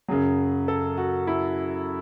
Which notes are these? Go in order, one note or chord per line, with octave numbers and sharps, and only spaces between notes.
F#2 C#3 F#3 G#4
A4
F#4
E4